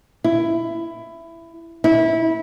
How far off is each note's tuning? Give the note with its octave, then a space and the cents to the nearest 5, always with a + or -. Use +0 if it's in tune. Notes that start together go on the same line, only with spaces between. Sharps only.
E4 +15
E4 -20